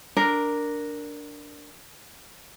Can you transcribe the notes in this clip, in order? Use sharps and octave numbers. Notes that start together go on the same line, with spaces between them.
D4 A#4